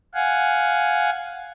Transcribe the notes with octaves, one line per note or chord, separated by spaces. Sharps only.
F5 F#5 G#5